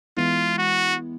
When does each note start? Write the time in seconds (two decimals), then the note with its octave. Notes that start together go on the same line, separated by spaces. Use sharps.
0.17 E3 G#3 B3 E4 F4
0.58 F#4